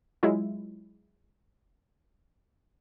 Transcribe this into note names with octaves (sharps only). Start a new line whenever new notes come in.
F#3 G#3 E4 F4